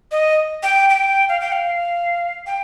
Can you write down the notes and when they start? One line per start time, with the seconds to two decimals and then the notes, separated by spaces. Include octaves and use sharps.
0.12 D#5
0.63 G5
0.90 G5
1.29 F5
1.40 G5
1.52 F5
2.47 G5